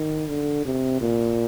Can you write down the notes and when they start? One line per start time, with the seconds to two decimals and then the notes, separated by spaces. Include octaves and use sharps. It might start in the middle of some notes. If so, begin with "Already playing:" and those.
Already playing: D#3
0.29 D3
0.65 C3
1.01 A#2